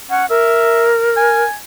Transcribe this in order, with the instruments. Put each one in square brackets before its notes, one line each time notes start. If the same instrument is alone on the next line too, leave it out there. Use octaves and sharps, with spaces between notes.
[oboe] C#4 [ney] F#5
[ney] A#4 [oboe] E5
[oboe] G#5